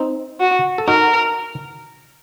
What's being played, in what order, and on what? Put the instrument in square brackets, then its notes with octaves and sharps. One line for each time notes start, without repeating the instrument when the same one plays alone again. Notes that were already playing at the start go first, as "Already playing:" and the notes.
Already playing: [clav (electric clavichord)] C4 D#4
[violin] F#4
[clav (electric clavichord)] A4
[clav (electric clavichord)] D#4 F#4 [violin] A#4